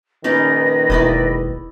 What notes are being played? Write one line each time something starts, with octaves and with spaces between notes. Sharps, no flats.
A#1 D#3 C#4 D#4 B4 D5 A#6
E1 E4 D5 D#5